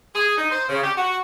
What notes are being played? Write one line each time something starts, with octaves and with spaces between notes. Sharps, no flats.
G#4
D#4
C5
C#3
G4
F#4